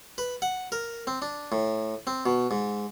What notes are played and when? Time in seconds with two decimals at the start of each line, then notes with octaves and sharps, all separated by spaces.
0.18 B4
0.42 F#5
0.72 A#4
1.07 C4
1.22 D4
1.52 A2
2.07 C4
2.26 B2
2.51 G#2